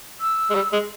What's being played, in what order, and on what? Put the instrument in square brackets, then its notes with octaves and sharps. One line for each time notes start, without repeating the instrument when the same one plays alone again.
[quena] E6
[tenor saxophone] G#3
G3
G#3